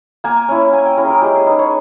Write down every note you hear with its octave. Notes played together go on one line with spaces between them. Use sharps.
A#3 G#5
C#4 E4
A#3 G#5
G5
C#4 E4 A#4
G#4
A#4
G#3 G4
G#4
D#4 B4
C#5